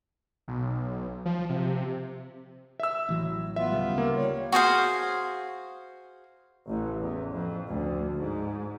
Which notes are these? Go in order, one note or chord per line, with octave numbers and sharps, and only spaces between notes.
B1
F3
C3
E5 E6
A1 E3 F#3
B3 F4 E5
D2 C#3 G3
A#3
G3 C#5
F#4 G#4 C5 F5
A1
E2
F2
D2
G#2